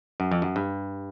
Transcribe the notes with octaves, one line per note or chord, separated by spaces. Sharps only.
F#2
F2
F#2
G2